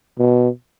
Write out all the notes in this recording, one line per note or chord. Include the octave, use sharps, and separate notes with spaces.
B2